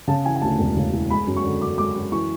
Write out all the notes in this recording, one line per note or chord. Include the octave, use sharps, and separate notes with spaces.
C#3 A5
E3 G#5
G#5
D2 A5
E1
C#3
E3
G#3 B5
F#2
C#6
D3
F#2 D6
G#3 D6
F#2
E3 C#6